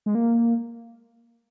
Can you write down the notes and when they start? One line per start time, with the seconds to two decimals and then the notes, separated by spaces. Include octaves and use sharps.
0.06 G#3
0.15 A#3